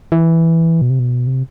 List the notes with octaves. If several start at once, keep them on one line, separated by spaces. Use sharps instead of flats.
E3
B2
C3
B2
C3